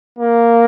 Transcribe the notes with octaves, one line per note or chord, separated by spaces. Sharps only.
A#3